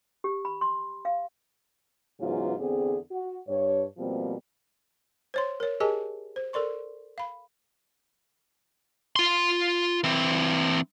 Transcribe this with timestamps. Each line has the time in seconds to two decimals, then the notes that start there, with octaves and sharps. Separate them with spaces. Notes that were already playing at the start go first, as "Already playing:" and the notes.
0.24 G4
0.45 B5
0.61 C6
1.05 F5
2.20 G#2 C#3 E3 F#3 B3 F4
2.59 E2 D3 B3 C4 G#4
3.11 F#4
3.48 G2 C#5
3.98 B2 F3 G3 A#3 C4
5.34 C5 C#5 C6
5.60 A#4 C#5
5.80 G4 G#4 A#4 D#5 G#5 A5
6.36 C5
6.53 A4 A#4 D5 C6 C#6
7.18 F5 B5
9.16 F4 C6
10.04 E3 C4